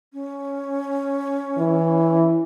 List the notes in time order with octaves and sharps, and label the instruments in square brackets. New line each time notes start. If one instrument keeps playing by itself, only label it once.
[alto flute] C#4
[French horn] E3